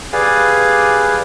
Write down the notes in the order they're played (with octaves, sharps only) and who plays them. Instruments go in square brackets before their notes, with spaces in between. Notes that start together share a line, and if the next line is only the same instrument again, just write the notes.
[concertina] G4 G#4 B4 D5 F5 G#5